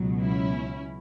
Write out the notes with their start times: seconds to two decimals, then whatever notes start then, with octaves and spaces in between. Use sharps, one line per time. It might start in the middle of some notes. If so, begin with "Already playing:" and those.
Already playing: C#2 B2 F#3
0.22 C#4 E4